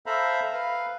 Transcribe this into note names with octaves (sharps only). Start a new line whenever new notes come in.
A4 C5 E5 F5 A#5 B5
B4 F5